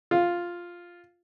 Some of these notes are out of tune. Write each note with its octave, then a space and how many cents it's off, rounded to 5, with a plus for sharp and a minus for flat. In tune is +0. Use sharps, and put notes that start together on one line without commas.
F4 +0